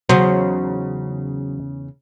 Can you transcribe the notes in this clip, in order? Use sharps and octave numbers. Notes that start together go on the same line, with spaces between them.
E2 C#3 F#3 D#4 C5